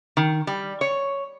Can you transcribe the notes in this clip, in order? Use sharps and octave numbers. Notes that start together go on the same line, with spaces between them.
D#3
G3
C#5